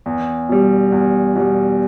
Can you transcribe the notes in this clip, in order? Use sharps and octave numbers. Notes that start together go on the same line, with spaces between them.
E2
B2 G3
E2
B2 G3